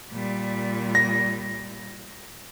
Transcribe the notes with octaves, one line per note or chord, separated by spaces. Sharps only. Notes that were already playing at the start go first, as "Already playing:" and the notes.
A#2 G3
A#6